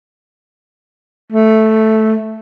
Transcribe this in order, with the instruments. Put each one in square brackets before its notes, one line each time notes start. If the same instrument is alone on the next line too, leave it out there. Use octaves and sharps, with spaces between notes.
[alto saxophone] A3